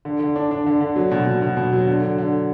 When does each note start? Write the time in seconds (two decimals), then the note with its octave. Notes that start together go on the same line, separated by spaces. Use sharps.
0.05 D3
0.20 D3
0.36 D4
0.51 D4
0.66 D3
0.81 D3
0.96 F#3
1.11 B2
1.26 B2
1.42 B2
1.57 B2
1.73 F#3
1.87 D3
2.02 D3
2.18 D3